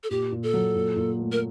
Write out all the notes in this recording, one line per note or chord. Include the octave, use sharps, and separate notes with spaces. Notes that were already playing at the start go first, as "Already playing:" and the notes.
A4
A#2 G4
A#2
A4
F#3
A#2
A#2
A3
A#4